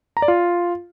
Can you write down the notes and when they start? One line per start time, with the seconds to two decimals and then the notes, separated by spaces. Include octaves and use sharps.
0.17 A#5
0.22 D5
0.28 F4